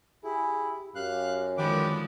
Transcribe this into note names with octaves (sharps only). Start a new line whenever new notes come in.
E4 G4 G#4
F#2 G4 F5 F#6
D3 D#3 F3 G#3 G4 B4 D6